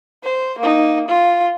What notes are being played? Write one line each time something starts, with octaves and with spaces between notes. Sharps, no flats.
C5
A#3 D#4
F4